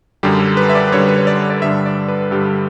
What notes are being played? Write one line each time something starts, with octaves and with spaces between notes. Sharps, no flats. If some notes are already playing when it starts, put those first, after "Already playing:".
F#2 D3 G3 G4
A4
B4
E5
D5
B4
F#2 D3 G3 C#5
B4
C#5
D5
D5
G2 D3 G3 E5
D5
B4
G2 D3 G3 G4